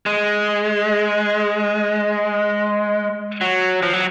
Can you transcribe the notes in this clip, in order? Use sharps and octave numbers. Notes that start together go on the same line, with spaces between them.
G#3
F#3
F3
F#3